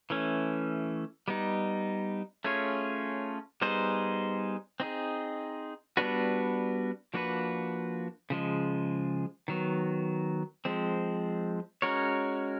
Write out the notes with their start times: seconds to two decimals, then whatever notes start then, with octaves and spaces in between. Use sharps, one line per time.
0.10 E3 A3 C#4
1.28 G3 B3 D#4
2.44 A3 C#4 F4 G#4 C#5
3.61 G3 B3 D#4 G#4 C5
4.80 C4 D#4 G#4
5.97 G3 B3 D4 F#4 B4
7.14 F3 A#3 D4 F#4 B4
8.30 C#3 F3 G#3
9.48 D#3 F#3 B3
10.65 F3 G#3 C4
11.82 G#3 C#4 F#4 A#4 C#5